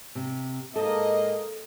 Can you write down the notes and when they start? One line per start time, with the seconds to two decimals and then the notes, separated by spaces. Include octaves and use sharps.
0.15 C3
0.76 G#2 A#3 A4 D#5